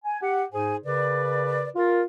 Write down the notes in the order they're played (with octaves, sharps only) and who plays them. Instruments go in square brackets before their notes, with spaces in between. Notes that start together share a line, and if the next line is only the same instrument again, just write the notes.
[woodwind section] G#5
G4 F#5
G#2 D#4 G#4 C5 G#5
C#3 A#4 B4 D5
F4 A#4